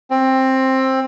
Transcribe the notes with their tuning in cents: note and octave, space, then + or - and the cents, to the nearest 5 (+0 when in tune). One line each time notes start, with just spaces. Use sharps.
C4 +15